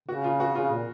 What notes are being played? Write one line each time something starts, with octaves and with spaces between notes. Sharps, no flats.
C#3 F#4
F4
F#4
C#3 F4
A#2